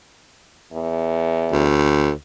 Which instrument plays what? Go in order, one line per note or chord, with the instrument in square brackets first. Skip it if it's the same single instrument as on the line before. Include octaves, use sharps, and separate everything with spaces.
[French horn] E2
[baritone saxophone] D2